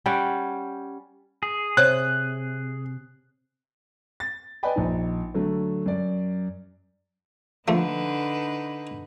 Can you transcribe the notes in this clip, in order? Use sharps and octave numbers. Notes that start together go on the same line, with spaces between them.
G3 C#4 F#5 G5
G#4
C3 C5 C#5 F#6
A6
B4 D5 D#5 G5 G#5 B5
A#1 D#4
D3 F#3 A3
F#2 D5
D3 F3 A3 D#4 B4